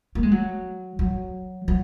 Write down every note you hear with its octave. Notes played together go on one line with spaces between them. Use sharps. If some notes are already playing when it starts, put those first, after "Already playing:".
A#3
G#3
F#3
F#3
F#3